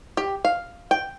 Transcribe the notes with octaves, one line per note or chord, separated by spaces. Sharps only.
G4
F5
G5